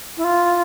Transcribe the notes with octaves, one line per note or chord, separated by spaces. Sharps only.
E4
F4